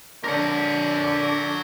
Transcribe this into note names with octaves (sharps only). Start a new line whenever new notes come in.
D3 A#4 C#5